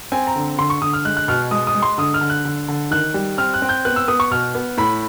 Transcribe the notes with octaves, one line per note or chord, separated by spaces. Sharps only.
C4 G#5
A#5
D3
D3 C6
C#6
D3 D#6
F6
G#3 F#6
F#6
B2 F6
G#3 D#6
D#6
G#3
C6
D3 D#6
F6
D3
F#6
D3
D3
D#3 F#6
G3
C4 F6
F#6
C4
G6
B3 F#6
E6
B3 D#6
C#6
B2 F6
B3
A2 B5